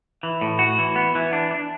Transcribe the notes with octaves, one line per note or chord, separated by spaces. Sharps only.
E3
A2
F#4
E3
B3
E3
D4
D4